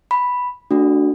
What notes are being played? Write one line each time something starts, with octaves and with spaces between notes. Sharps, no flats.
B5
A3 D4 F#4